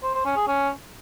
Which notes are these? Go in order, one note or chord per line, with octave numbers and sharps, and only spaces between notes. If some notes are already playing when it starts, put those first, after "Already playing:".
C5
C5
C#4
G#4
C#4